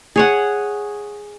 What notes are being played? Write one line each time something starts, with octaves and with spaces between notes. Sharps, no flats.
G#4 C#5 F#5